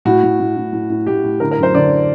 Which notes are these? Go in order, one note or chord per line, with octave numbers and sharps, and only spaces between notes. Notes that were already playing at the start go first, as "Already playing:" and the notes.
A2 F#4
A2
A2
A2
A2
A2
A2 G4
A2
D3 A#4
A#4
F#2 C5
D3 D5